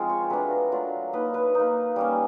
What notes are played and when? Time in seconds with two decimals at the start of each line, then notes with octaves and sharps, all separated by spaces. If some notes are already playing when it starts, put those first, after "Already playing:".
Already playing: F3 G#3 C4 F4
0.09 C#5
0.30 F#3 A3 D4 F4 B4
0.51 A#4
0.72 F#3 A3 D4 F4
1.13 A#3 D#4 B4
1.34 B4
1.55 A#3 D#4
1.96 G3 A#3 C#4